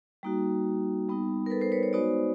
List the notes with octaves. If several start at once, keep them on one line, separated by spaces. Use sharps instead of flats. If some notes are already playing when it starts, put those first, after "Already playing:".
G3 A#3 D#4 F#4
G3 B3 D#4
A#4
A4 B4
A#4 C5
B4 C#5
B4 C#5
G#3 B3 D#4 F#4 C5 D5